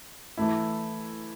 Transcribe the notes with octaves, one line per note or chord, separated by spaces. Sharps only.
E3 A3 E4